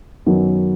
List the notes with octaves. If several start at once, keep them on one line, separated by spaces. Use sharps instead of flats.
F#2 D#3 F#3 B3